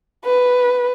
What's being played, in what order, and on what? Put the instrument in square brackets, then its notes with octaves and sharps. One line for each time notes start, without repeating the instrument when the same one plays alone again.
[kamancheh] B4